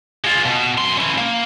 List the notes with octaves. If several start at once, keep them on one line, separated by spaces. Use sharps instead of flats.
G#3 F4
B2
F#2 C6
C#4 E4
A#3